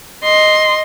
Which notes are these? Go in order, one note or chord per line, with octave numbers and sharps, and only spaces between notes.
D#5 C6